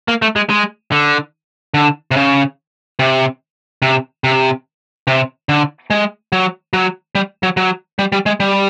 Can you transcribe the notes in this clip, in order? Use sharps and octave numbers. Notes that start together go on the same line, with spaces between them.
A#3
A3
G#3
G#3
D3
D3
C3
C#3
C3
C3
C3
C3
D3
G#3
F#3
F#3
G3
F#3
F#3
G3
G3
G#3
G3